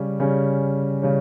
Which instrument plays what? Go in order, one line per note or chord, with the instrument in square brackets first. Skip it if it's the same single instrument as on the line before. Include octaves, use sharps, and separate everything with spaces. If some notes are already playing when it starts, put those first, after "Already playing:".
Already playing: [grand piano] C#3 G3 C#4
C#3 G3 C#4
C#3 G3 C#4